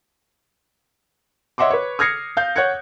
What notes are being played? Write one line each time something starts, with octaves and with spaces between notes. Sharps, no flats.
C#5 D#5 E5 F#5 C6 D6
B4 C#5
D#6 F6 G#6 A#6 C7 C#7
F5 G6
C#5 F#5 F#6 G#6 C#7